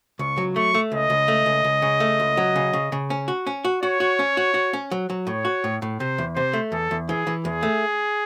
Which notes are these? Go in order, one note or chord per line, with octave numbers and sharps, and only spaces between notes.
C#2 C#6
F#3
A3 C#6
A3
C#2 D#5
C#2
A3
C#2
C#2
C#3
A3
C#2
F#3
C#3
C#3
C#3
C#4
F#4
C#4
F#4
F#4 C#5
F#4
C#4
F#4
F#4
C#4
F#3
F#3
A2 C#5
F#4
A2
A2
C3 C5
E2
C3 C5
A3
E2 A4
E2
E3 G#4
E3
E2 G#4
A3